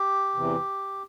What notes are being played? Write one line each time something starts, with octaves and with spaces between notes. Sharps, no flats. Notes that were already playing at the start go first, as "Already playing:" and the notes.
Already playing: G4
E2 C3 E3